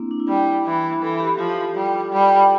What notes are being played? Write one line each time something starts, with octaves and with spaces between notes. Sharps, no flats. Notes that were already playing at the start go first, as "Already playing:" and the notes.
Already playing: A#3 C4 D4 E4
D4
E4
G3
E3
E3 A4
G4
F3 F4
F4
G3
G3